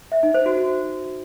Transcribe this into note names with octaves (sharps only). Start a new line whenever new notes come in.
E5
D#4
C5
F#4
F#4